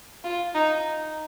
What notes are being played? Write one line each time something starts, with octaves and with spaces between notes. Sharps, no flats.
F4
D#4